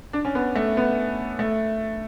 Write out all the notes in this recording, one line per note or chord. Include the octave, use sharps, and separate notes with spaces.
D4
C#4
B3
A3
B3
A3